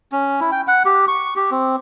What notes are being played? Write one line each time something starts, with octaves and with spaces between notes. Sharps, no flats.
C#4
E4
G5
F#5
G4
C#6
G4
C4